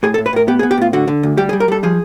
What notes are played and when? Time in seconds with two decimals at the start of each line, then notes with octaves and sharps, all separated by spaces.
0.03 A2 G#4
0.14 A4
0.18 A2
0.26 B4
0.33 A2 A#4
0.48 B3 G4
0.59 G#4
0.63 B3
0.71 G4
0.78 A2 F4
0.93 D3 F#4
1.08 D3
1.23 D2
1.37 G3 G4
1.49 G#4
1.53 G3
1.60 A#4
1.68 G3 A4
1.83 F3 G#4